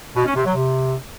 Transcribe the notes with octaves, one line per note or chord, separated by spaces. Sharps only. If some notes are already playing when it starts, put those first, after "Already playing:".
B2
C#4
C3
F#3
C3